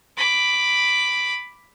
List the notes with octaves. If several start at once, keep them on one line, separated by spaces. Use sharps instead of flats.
B5 D6